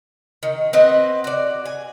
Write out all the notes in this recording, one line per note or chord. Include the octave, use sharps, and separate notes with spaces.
D#3
C4 B4 D#5 F#5
F#4 D5
G#5